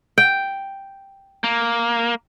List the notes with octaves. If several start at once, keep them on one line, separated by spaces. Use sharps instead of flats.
G5
A#3